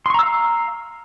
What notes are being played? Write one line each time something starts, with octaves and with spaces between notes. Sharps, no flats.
F5 A#5 C6 C#6 E6